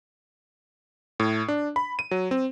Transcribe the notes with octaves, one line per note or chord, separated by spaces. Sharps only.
A2
D4
B5
D#7
F#3
C4